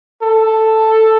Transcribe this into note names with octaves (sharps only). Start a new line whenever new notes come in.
A4